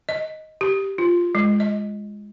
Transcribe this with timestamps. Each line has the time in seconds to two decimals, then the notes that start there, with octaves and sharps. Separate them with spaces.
0.09 D#5
0.61 G4
0.98 F4
1.35 G#3
1.60 D#5